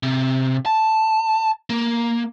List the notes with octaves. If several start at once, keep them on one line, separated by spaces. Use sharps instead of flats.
C3
A5
A#3